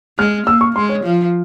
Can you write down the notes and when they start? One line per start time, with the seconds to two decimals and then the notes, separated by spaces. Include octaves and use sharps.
0.18 G#3 F6
0.47 A#3 E6
0.61 C#6
0.75 G#3 C6
0.89 C#5
1.04 F3